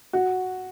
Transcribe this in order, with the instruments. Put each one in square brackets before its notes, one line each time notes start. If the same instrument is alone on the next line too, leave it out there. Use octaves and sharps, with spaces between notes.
[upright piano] F#4